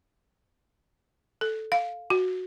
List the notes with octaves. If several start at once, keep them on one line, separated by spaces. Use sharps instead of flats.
A4
F5
F#4